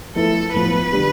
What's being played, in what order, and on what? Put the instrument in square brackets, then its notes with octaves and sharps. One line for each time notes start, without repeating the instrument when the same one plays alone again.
[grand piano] F3 A3 E4 B4 [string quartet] A4
[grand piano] A2 F3 B3 [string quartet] B4
[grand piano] D3 G3 D4 G4